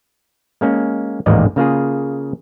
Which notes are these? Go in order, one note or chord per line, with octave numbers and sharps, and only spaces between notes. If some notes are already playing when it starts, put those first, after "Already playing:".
G#3 A#3 C#4
A1 D#2 G#2 A#3 D5 D#5
C#3 A#3 F4 G#4